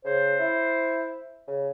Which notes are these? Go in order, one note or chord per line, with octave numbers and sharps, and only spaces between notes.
C#3 C5
E4
C#3